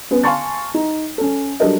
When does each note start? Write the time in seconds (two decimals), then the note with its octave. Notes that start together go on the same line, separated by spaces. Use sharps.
0.11 B3 C#4
0.24 F5 G#5 A5 C6 C#6 A6
0.74 D#4
1.18 C#4 A4
1.60 F#3 G3 D4 A4 A#4 D#5